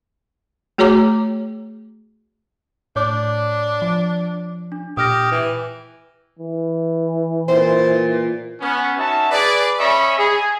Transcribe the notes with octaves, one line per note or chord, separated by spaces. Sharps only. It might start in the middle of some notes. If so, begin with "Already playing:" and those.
A3 F#4 G#4 C#5 A#5 D6
A2 D4 C#5 D6
F3
D4
A#2 G4 D#6 F6 A#6
E3
E3
A#2 C5
B3 C#4
C#4 D#4 F#4 E5 A5
G#4 B4 D5
C#4 D#5 E5 B5 C#6
G#4